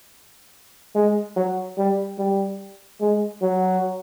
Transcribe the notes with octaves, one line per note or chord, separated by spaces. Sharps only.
G#3
F#3
G3
G3
G#3
F#3